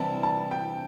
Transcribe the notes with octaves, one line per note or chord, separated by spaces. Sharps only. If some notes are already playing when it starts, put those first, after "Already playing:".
Already playing: C2 C3 E3 G3 A5
A5
G5